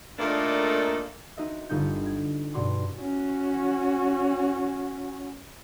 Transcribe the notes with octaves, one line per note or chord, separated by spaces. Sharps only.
A#2 A3 A#3 D4 D#4 A4
D#4 F#4 C5 D#5 E5
G1 G3 D#4 F4 G6 C#7
G#6
G2 B2 F#4 D5 C6 D6
C#4 F#4